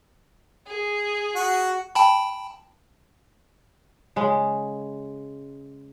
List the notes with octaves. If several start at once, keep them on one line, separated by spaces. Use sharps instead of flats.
G#4
F#4
G5 A5 B5
C#3 G#3